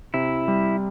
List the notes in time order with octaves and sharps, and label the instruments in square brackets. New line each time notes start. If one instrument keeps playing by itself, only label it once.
[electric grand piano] C3 [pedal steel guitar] E4
[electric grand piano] G3